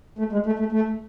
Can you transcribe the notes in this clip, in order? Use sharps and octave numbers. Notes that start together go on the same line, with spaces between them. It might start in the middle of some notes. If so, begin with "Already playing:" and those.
A3
G#3
A3
A3
A3